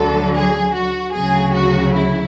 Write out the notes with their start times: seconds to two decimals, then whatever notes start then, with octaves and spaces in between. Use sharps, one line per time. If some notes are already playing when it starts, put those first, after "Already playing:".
Already playing: D2 D3 F#3 A4
0.36 G#4
0.75 F#4
1.15 D2 C#3 F#3 G#4
1.56 F#4
1.95 E4